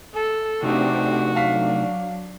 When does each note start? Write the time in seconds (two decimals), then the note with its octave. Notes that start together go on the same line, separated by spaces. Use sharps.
0.15 A4
0.63 C3 A3 C4 D4 D#4 F#4 G4
1.36 F#3 D4 F5 B6 C7